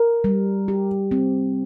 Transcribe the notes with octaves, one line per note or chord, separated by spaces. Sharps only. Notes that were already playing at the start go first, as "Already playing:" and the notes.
Already playing: A#4
G3
G4
C4